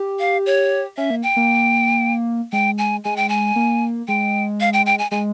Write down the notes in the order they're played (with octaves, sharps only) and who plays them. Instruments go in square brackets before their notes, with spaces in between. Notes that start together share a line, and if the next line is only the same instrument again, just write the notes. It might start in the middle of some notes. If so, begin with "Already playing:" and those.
Already playing: [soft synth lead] G4
[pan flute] F5
C#5
[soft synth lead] C#4 [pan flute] E5
[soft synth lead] A#3
[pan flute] G5
[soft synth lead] A#3
[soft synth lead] G#3 [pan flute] G5
[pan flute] G#5
[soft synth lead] G#3 [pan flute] G#5
[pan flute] G5
G#5
[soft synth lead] A#3
[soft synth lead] G#3 [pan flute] G5
[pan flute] F5
G5
G5
G#5
[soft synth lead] G#3 [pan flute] G#5